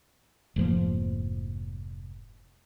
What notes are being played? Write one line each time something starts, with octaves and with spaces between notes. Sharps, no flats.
F1 G#2 F3 A#3